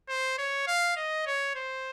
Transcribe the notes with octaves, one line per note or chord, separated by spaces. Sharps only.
C5
C#5
F5
D#5
C#5
C5